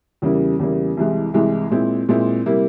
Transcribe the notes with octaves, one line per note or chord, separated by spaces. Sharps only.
E2 C#3 G3 A#3 E4
E2 C#3 G3 A#3 E4
C2 C3 E3 G#3
C2 C3 E3 G#3
A#2 G#3 C4 E4
A#2 G#3 C4 E4
C3 G3 A#3 E4